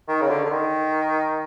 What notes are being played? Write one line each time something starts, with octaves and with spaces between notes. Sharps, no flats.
D#3
C#3
D3
D3
D#3